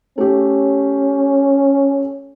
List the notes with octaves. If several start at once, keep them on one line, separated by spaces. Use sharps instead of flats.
A3 C#4 G4